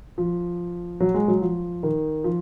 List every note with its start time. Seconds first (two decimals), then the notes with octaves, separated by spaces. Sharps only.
0.18 F3
1.00 F#3
1.14 G#3
1.28 F#3
1.41 F3
1.83 D#3
2.24 F3